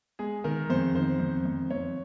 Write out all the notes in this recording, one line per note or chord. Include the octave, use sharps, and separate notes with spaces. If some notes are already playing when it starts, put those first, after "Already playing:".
G#3 G#4
D#3 A#4
F2 C5
D#3 C5
F2
F2
F2 C#5